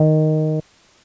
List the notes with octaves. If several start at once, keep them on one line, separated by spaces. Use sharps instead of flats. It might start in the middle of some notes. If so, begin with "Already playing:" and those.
Already playing: D#3